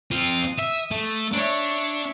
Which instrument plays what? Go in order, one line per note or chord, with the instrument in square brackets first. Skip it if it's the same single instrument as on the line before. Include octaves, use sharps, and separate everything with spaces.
[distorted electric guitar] C4 F4 [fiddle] D#6
[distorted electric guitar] E5
A3
[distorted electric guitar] D4 [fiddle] C#5 E5